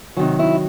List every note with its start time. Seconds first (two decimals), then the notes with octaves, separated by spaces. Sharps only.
0.17 C3 D#3 F#3 F#4
0.39 E4